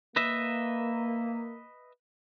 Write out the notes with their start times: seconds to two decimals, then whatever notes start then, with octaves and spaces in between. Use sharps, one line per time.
0.16 A#3 B4 D#5 E5